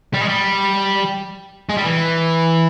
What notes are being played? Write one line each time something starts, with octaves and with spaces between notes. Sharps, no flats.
G3
G#3
G3
G#3
G3
E3